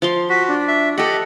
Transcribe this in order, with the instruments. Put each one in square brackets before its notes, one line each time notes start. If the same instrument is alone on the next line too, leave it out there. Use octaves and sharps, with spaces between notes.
[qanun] F3 F5 C6
[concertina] F#4 [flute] B6
[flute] D4
[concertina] E5
[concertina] G4 D#5 [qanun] A4 F#5